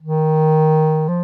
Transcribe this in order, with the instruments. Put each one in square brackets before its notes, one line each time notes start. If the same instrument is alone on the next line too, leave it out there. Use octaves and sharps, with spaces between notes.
[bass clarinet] D#3
F3